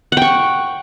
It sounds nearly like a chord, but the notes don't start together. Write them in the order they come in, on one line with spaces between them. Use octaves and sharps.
F#5 G5 C#6